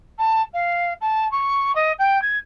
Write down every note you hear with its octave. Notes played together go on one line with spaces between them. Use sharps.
A5
F5
A5
C#6
D#5
G5
G#6